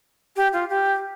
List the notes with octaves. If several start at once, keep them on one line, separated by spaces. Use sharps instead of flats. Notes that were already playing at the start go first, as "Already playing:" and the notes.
G4
F4
G4